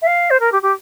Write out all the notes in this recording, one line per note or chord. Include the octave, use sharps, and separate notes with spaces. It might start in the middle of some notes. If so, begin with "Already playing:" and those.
E5
F5
C5
A#4
G4
G4